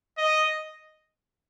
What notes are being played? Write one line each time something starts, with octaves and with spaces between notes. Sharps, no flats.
D#5